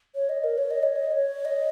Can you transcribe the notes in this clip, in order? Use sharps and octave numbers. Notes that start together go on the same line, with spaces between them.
C#5
D#5
A#4
C#5
D#5
C#5
D#5
D#5
C#5
D#5